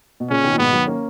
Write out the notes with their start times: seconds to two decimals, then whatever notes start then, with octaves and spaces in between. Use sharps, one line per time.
0.20 B2
0.30 A#2 C#3 C#4
0.44 B2 D#3
0.53 A#2
0.58 G#2 B2 B3
0.72 D#3 F#3
0.87 A#3 C#4